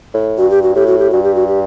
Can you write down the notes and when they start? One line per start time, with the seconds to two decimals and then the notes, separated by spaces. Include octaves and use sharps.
0.14 A2
0.38 G2 F#4
0.50 G4
0.62 F#4
0.75 A2 G4
0.87 F#4
0.99 G4
1.11 G2 F#4
1.23 G4
1.35 F#4
1.47 G4